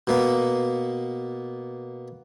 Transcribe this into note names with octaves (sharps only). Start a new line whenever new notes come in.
B2 A#3 B3